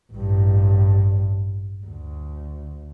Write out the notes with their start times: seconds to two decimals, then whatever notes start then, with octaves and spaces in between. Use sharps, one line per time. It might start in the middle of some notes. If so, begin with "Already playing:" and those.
0.12 A1 G2
1.86 D2